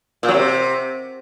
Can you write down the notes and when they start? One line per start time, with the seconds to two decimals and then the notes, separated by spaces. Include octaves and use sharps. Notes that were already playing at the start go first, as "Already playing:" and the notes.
0.23 A#2
0.28 F#3
0.34 C3